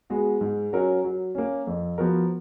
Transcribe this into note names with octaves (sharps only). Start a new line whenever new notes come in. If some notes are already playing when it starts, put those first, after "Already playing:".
G#3 B3 F#4
G#2
F#3 C#4 F#4 A#4
F#3
A#3 C#4
F2
F3 B3 F#4 A#4